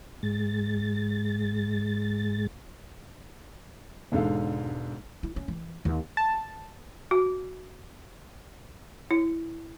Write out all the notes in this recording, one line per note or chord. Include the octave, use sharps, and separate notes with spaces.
G#2 G#3 A6
E1 G#2 D3 A4 F5
E4
C#4
E3
D#2
A5
F#4
E4